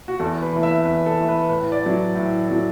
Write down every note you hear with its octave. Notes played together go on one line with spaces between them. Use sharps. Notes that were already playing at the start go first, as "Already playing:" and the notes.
F#4
E2 A4
B4
E3 A3
E5
E2 B4
A4
E3 A3
B4
A2 B4
D5
F#3 A3
A2
F#3 A3